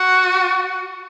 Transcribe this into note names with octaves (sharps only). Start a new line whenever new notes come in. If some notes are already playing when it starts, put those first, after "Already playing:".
Already playing: F#4